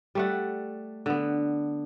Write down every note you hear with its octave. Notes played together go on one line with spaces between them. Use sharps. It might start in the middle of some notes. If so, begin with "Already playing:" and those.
G3 A3 F#5
D3 B3